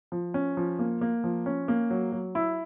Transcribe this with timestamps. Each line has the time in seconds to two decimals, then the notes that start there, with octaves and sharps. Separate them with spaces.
0.12 F3
0.34 C#4
0.57 F3
0.79 A#3
1.01 A#3
1.24 F3
1.46 C#4
1.68 A#3
1.90 F#3
2.12 F#3
2.35 E4